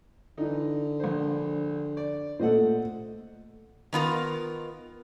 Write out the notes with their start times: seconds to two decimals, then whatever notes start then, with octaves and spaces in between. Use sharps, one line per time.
0.38 D3 E3 D#4
1.00 A#1 C5
1.97 D5
2.39 A#2 A3 A4 C5 D#5 F#5
3.93 D#3 B3 F4 A#4